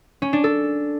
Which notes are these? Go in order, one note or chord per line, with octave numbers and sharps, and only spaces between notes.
C#4
D4
A4